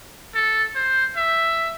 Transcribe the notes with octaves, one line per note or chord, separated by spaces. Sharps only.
A4
C5
E5